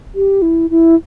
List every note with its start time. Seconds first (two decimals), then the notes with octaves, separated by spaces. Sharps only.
0.15 G4
0.42 E4
0.70 E4